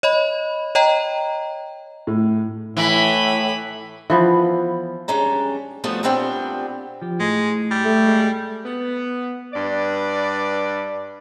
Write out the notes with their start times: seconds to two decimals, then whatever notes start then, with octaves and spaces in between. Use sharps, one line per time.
0.03 C#5 D#5 B5
0.75 C#5 D#5 G5 A#5
2.07 A2
2.77 A2 E3 B5
4.10 E3 F3 B3
5.08 G3 G#3 C#4 D4 A#5
5.84 F3 G3 A3 B3 F4 F#4
6.03 A#2 G3 B3 C4 D4 G5
7.02 F3 G4
7.20 A2 G#3
7.71 G3
7.84 A3
8.07 G#3
8.65 B3
9.54 G2 B4 D5